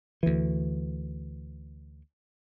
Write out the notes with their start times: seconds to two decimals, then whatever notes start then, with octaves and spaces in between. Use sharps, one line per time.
0.23 D2 E3